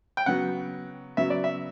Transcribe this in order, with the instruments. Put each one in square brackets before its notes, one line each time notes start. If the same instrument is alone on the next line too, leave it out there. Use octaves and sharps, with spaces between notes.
[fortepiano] G5
[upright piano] C#3 F#3 B3 [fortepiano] F#5
[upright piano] C#3 F#3 B3 [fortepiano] E5
[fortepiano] D5
E5